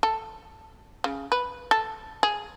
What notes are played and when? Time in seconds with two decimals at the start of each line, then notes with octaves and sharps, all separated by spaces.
0.03 A4
1.04 C#3
1.32 B4
1.71 A4
2.23 G#4